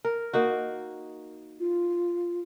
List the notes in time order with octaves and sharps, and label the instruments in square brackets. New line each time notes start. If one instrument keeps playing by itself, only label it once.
[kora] A#4
A#3 D#4 F#4
[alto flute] F4